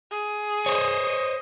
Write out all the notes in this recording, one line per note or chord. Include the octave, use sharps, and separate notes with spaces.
G#4
C5 C#5 D#5